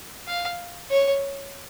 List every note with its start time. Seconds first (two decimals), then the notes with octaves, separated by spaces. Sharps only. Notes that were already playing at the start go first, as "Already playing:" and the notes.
0.27 F5
0.90 C#5